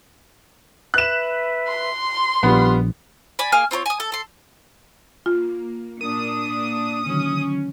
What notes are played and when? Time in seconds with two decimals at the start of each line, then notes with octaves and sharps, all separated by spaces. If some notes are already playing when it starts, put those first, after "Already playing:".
0.94 B4 E5 F#6 E7
1.68 C6
2.43 A#1 G3 B3 F4 B4
3.39 D5 G#5 B5
3.52 A#3 G#4 G#5 F6
3.71 C4 F4 A#4 C#5
3.86 G#5 D#6
4.00 A4
4.12 A4 C6
5.26 A#3 F4
6.01 A#2 D4 A#4 D#6
7.06 D3 D#3 F#3 C#4